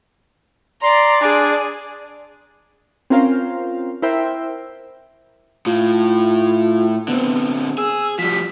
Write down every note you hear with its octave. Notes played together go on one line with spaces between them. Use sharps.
D5 A#5 C6
D4 G#4
C4 C#4 F4 A#4 C5 F5
E4 A#4 C5 E5 G5
A2 F4
D3 B3 C4
G#4 E6
F3 G3 B6